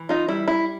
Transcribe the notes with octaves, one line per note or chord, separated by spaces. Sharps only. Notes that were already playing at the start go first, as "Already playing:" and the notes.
Already playing: E3
D#4 F4
G3 E4
E4